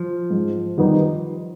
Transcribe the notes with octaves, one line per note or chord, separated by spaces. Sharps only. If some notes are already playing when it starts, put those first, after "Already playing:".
Already playing: F3
G#2
D#3 G3 B3 D#4